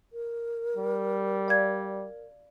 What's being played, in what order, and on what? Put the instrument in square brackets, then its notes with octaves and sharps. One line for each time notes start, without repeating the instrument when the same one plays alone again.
[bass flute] A#4
[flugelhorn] G3
[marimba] D5 F5 G#6